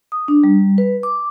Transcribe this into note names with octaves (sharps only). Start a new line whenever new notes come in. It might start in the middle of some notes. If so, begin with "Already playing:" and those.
D#6
D4
G3
B4
D6